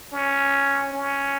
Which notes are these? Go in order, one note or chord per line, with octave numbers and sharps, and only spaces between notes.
C#4
C#4